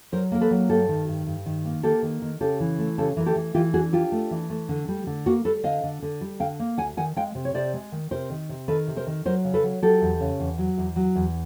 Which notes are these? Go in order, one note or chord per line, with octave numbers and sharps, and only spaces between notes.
F#3 A#4 C5
A#3 A#4
A4 B4
F#3
G2 G4 A4
D#3
G2
G2
D#3
A#3
A#3 G4 A4
D#3
D#3
C#3 G4 A4
E3
A3
C#3 G4 A4
E3 A#4
G4 A4
E3
E3 F4 G4
D4 F#4 G#4
D4 F4 G4
A3
E3
A3
D3
G3
D3
A#3 F#4
G3 A4 B4
D3 D#5 F5
D3
D3
G3
D3 F5 G5
A#3
D2 F#5 G#5
D#3 F#5 G#5
G#3 F5 G5
C3
C#5
C3 C5 D5
G#3
D#3
C3 A#4 C5
D#3
C3
D#3 A4 B4
C3
A#4 C5
D#3
F#3 A#4 C5
C#3
A4 B4
F#3
F#3 G4 A4
E2
C#3
E2
F#3
E2
F#3
E2